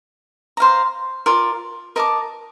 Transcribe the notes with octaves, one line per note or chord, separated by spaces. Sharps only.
C5 F5 A#5
F4 A#4 D5
A#4 D#5 A5 D6